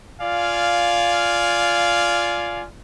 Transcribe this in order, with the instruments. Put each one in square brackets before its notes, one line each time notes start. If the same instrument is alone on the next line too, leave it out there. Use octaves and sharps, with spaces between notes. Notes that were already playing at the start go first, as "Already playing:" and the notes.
[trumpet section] F4 D5 F5 G#5